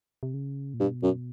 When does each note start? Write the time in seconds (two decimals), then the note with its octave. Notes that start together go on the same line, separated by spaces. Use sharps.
0.23 C3
0.34 C#3
0.74 A#2
0.80 G2 B2
1.03 F#2